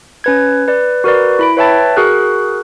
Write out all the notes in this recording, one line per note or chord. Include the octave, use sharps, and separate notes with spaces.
C#4 B4 G#6
B4 D5
F#4 A#4 B4 D5
E4 B5 D7
B4 C#5 E5 G5 A5 A6
F#4 G#4 A#4 F#6